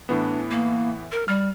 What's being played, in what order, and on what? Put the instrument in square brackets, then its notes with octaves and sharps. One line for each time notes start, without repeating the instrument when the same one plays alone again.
[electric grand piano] A2 E3 B3 [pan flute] D4
[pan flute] A#3
A#4
[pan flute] G3 [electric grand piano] F6